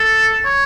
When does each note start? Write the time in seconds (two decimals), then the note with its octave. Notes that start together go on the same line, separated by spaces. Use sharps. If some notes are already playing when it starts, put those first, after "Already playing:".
Already playing: A4
0.45 C#5